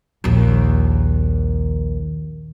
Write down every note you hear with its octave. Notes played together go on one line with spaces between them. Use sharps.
A#1 D#2